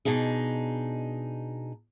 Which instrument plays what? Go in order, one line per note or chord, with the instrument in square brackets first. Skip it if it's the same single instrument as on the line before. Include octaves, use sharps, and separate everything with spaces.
[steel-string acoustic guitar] B2 D4 D#4 G#4